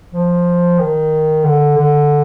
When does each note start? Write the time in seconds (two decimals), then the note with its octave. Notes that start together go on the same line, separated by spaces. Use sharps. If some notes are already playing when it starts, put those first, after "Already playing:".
0.12 F3
0.79 D#3
1.44 D3
1.77 D3